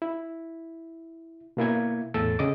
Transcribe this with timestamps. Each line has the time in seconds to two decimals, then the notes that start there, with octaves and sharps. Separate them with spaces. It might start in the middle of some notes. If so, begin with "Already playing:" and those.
0.02 E4
1.57 B2 A#3 E4 G#6
2.14 E2 A2 A4 E6 A6
2.39 C#3 D#5 D6